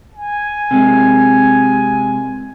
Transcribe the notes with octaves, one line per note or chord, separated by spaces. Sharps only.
G#5
C3 G#3